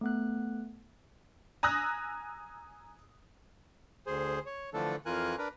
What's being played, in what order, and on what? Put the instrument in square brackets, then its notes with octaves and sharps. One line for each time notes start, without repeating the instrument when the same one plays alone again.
[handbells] A3 B3 F#6
[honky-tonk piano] G#5 A#5 D#6 E6 F#6 A#6
[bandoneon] D2 G#4 C5
C#5
D3 E3 F3 A3 D4 A4
F2 E3 F4 A#4 G#5 F#6
D4 A#4 B4